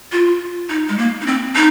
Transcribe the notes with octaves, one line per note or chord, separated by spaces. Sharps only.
F4
D#4
G#3
A#3
D#4
C4
D#4